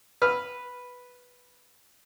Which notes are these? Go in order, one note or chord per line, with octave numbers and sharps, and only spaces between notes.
B4 F6